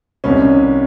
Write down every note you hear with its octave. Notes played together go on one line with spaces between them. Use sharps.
C2 C3 D#3 C#4